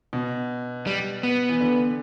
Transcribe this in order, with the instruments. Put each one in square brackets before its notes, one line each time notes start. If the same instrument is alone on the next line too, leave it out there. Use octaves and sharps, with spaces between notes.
[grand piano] B2
[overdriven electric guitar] G3
B3
[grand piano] E3
D3